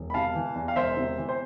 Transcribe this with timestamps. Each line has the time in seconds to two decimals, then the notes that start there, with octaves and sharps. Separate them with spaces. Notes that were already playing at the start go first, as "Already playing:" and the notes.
Already playing: E1
0.10 B5
0.14 C3 F5 A5
0.35 E3
0.56 E2
0.68 F5
0.76 E1 C5 E5
0.97 C3
1.18 E3
1.29 C5